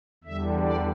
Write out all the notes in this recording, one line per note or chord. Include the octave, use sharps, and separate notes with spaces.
E2 D3 G3 E5
D5